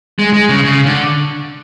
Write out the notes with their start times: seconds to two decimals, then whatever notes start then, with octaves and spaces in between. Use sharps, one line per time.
0.19 G#3
0.34 G#3
0.49 C#3
0.64 C#3
0.86 D3